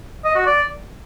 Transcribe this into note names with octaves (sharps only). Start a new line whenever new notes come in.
D#5
F#4
D5